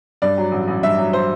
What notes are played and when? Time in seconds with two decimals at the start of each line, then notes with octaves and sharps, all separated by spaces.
0.22 G2 D5
0.38 F#3
0.52 A1
0.68 A1
0.83 G2 E5
0.98 F#3
1.13 C5